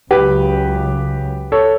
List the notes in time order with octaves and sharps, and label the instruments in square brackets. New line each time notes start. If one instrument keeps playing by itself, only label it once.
[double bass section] C#2 C#3 F#3 [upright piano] G4 B4
[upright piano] A4 C#5